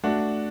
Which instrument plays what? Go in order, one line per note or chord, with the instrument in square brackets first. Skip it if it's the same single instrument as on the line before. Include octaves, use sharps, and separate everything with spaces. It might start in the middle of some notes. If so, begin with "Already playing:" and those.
[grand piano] A3 [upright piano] D4 F#4